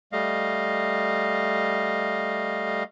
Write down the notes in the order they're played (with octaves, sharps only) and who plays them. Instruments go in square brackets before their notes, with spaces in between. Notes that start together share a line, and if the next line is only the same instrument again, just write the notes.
[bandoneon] G3 A3 D#5 F5